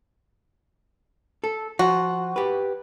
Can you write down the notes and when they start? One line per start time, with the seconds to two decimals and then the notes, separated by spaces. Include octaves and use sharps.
1.44 A4
1.79 F3 F#4
2.36 G4 B4